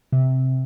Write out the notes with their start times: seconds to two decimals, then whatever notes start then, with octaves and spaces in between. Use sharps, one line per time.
0.12 C3